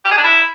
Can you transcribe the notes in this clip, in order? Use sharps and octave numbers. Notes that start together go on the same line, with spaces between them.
G4
G#4
D4
E4